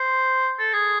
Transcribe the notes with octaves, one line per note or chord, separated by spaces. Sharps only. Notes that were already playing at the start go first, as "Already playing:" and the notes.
Already playing: C5
A4
G#4